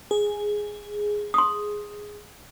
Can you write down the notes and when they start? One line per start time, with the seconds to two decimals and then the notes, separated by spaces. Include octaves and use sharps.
0.11 G#4
1.34 C6 D#6